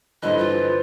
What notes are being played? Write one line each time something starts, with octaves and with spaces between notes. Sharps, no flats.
G2 D3 E3 B4 C5 D#5
F4